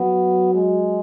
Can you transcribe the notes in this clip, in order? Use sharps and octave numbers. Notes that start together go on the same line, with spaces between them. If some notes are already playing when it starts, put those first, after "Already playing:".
Already playing: F#3 B3
G#3